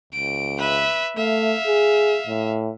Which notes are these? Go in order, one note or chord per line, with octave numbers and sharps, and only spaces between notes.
C#2 D7
B4 E5
A3 E5 F5
G#4
A2